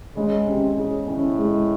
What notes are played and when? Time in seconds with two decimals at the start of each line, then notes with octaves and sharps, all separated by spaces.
0.16 C#3 G#3
0.47 C3 C#4
0.77 C#3 G#4
1.07 A2 C#4
1.38 G#3